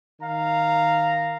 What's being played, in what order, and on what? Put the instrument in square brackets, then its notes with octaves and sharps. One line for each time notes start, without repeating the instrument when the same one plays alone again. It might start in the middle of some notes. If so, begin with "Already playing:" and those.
[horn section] D#3 F5 A#5